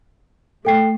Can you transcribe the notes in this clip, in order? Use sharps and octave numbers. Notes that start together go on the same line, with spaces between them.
A3 A4 G5 C7